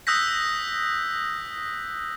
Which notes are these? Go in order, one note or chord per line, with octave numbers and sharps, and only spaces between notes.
D#6 E6 F#6 G6 A#6 B6